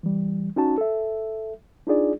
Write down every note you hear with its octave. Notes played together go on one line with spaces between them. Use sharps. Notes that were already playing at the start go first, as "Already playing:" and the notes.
E3 G3
C#4 D#4 F#4 A5
A4 E5
D4 D#4 F4 G#4 D5